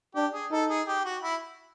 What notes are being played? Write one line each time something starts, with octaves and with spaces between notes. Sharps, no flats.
D4 G4
G#4
D#4 A4
G#4
G4
F#4
E4